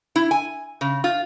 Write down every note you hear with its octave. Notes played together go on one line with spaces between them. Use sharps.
E4
G#5
C#3
F4